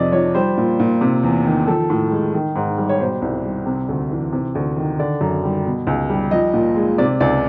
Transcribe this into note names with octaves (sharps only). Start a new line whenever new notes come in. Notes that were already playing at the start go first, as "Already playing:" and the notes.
Already playing: F2 C3 D5 D#5
F3 C#5
G3 C5
A#2
A#2
C3
E2
D#3
F3 A4
A2
G#3
D#3
G#2
G3
C#5
B2 C5
C2
G3
C3
D2
E3
C3
D2
D#3
D3 D5
F#2
G3
B2
C#2
G3
F3 D#5
A#2
G#3
C3 D5
C#2 D5